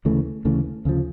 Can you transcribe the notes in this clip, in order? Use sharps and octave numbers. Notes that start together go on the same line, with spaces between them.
D2 C#3 E3 A3
D2 C#3 E3 A3
D2 C#3 F3